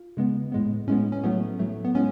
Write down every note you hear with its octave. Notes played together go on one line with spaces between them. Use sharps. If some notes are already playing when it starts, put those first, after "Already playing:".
Already playing: F4
C#3 G#3 B3
A2 G#3 B3
A2 G#3 B3 C#4
C#4
A2 F#3 A3 B3
A2 F#3 A3
B3
A2 G#3 B3 C#4